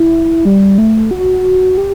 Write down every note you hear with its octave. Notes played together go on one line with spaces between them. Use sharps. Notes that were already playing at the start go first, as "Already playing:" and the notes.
Already playing: E4
G3
A3
F#4
G4